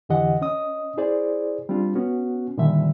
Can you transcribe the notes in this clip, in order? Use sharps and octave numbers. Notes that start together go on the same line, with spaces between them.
F2 D3 E3 G4 D#5 F#5
C#4 D#5 D#6
E4 G#4 C5 D5
G3 C4 D4 F4
B3 C#4 F#4
A#2 D3 D#3 F3 G3 E5